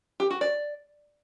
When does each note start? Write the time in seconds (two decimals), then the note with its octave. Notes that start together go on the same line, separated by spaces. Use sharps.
0.20 G4
0.30 F#4
0.41 D5